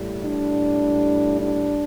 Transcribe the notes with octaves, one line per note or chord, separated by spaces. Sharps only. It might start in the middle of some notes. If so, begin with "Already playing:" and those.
Already playing: A2 G3
D4
D4